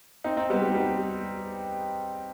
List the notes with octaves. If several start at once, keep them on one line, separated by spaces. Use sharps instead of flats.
C4 D#4
C4 D#4
G3 B3
G3
G3 B3